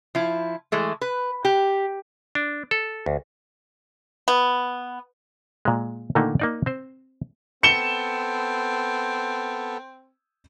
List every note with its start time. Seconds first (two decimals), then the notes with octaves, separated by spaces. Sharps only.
0.15 F3 E4
0.72 E3 G#3 A3
1.01 B4
1.45 G4
2.35 D4
2.71 A4
3.06 D2
4.28 B3
5.65 A#2 G#3
6.15 A#2 D3 D#3 A3 A#3 D#4
6.40 A#3 D#4 D5
6.66 C4 C5
7.63 B3 C4 A4 C#7 E7 G7